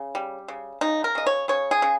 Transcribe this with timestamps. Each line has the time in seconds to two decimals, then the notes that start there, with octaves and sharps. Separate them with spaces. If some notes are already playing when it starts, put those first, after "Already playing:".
Already playing: C#3
0.15 G3
0.48 C#3
0.81 C#3 D#4
1.04 A#4
1.15 C#3 D#5
1.26 C#5
1.48 C#3 C#5
1.71 G#4
1.82 C#3